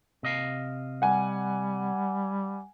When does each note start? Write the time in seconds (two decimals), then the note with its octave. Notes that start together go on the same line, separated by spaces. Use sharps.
0.23 C3 D#5 F5
1.02 G3 F#5 G#5